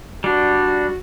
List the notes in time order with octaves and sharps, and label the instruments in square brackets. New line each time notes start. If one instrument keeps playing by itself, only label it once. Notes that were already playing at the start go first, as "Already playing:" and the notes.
[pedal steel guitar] G3 D4 [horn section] F#4